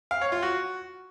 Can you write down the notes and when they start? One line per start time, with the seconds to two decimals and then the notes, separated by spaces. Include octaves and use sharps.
0.11 F5
0.21 C#5
0.32 F4
0.43 F#4